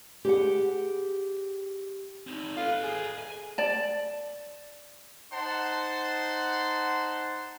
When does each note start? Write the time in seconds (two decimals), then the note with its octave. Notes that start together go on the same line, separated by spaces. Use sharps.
0.25 G4 G#4 B4 F#5
2.27 C4 D#4
2.57 A4 B4 F5
2.83 G#4
3.19 G#5
3.58 D5 A5
5.32 D#4 C5 F#5 A5 C6